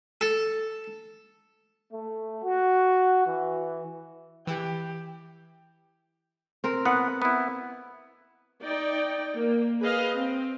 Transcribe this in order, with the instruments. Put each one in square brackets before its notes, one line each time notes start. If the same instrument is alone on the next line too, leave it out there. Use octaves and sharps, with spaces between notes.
[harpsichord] A4
[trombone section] A3
F#4
E3
[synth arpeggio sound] E3 E4 [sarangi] G4
[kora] C4 A#4
[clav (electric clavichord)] B3 [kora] F#5
[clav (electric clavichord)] B3 E4
[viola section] D#4 D5 G5
A#3
G#4 B4 D#5 F5
C4